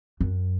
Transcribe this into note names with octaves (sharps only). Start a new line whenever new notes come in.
F#2